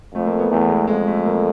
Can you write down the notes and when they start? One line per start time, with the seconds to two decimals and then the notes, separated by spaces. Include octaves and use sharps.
0.15 F2 A3
0.26 A#3
0.39 B3
0.51 E2 A3
0.69 G#3
0.88 F2 G#3
1.07 A3
1.25 A#3